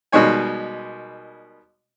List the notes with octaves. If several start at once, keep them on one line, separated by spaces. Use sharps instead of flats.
B2 D#3 G3 G#3 C#5 G#5